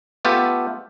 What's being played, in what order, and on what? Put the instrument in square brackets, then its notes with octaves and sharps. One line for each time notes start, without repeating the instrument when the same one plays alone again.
[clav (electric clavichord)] A3 B3 F4 G4 E5 A5